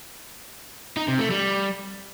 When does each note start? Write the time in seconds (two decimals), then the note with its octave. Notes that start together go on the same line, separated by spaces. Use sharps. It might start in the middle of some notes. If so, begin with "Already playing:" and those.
0.97 D#4
1.08 C3
1.19 A3
1.30 G3